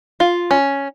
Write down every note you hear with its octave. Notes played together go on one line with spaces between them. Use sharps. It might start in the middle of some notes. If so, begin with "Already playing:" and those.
F4
C#4